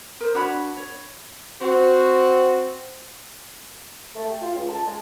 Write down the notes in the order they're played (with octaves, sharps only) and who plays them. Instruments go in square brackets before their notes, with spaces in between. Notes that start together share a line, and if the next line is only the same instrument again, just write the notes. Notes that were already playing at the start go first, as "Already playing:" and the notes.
[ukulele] A#4 C5
D4 F#4 C#5 B5
C#5
[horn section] C4 F#4
[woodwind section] A3
G5
F4
C#2
A5
G#3